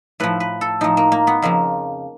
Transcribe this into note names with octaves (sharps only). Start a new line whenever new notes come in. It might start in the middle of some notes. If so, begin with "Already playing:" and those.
A2 F3 B4
B4
A4
A2 F3 D#4
A#3
A#3
B3
F2 C#3 F3 A#3